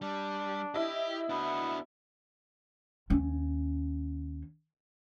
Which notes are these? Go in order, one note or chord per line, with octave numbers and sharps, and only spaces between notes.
G3 D4
E4 G4 D#5
B3 D4 F#4
D#2 C#4